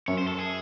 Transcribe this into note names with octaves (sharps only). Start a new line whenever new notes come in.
F#2 C#5
C5
A4
G#4